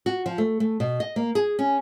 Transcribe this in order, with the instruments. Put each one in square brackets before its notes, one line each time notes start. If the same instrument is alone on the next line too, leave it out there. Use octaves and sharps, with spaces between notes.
[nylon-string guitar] F#4
F3
A3
A3
B2
D#5
A#3
G#4
C#4